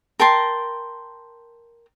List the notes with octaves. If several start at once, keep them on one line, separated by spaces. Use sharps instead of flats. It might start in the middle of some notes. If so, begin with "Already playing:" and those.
A#4 G5 A5 C6